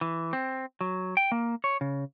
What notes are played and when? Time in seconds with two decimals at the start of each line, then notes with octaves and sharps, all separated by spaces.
0.01 E3
0.33 C4
0.81 F#3
1.17 G5
1.32 A#3
1.64 C#5
1.81 C#3